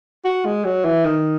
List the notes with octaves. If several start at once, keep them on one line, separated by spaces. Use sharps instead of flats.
F#4
G#3
F#3
E3
D#3